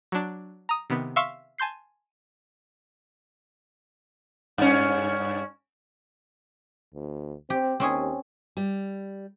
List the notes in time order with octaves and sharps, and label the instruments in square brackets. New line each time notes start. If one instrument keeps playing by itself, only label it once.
[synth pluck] F#3 D4
A#5 D#6
C3 D#3 B3
E5 F5 C6 C#6 E6 F6
G#5 A5 C6 G6 C7
[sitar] G2 C#4
[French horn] D2
[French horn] C4 [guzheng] G4
[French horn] D#2 [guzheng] C4 C#4 G#4
[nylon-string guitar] G3